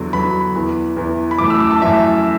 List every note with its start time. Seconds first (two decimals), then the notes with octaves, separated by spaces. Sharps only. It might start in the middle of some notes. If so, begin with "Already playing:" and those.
Already playing: E2 D3 F#3 B3
0.13 E2 D3 F#3 B3 B5
0.55 E2 E3 B3
0.97 E2 E3 B3
1.31 B5
1.38 F#2 E3 A3 D6
1.50 E6
1.60 D6
1.71 A5
1.81 F#2 E3 A3 E5